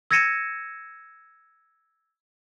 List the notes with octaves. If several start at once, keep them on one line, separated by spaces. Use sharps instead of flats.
E6 G#6 A#6 C#7 D#7 E7